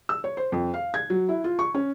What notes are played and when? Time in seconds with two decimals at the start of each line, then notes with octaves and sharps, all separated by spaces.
0.09 E6
0.24 C#5
0.37 C5
0.52 F2
0.74 F5
0.94 G#6
1.10 F#3
1.29 E4
1.44 F4
1.59 C#6
1.74 C#4